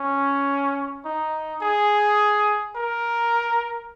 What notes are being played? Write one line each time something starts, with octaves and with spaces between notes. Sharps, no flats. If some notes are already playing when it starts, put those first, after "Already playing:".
Already playing: C#4
D#4
G#4
A#4